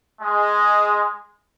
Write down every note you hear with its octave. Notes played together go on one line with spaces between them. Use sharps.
G#3